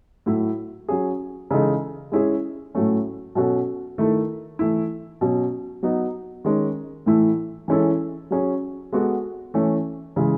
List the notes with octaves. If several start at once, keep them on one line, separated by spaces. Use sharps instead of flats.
A2 F#3 A3 E4
F#3 C#4 G#4
C#3 E3 G#3 D#4 A4
G#3 C#4 E4 G#4
A2 F#3 A3 C#4
B2 F#3 C#4 F#4 A4
D#3 A3 E4 A4
E3 A3 E4
B2 F#3 C#4
F#3 B3 D#4
D#3 G#3 C#4
A2 E3 A3 E4
E3 G#3 C#4 E4 A4
F#3 C#4 G#4
G#3 B3 F#4 A4
E3 A3 C#4
C#3 E3 G#3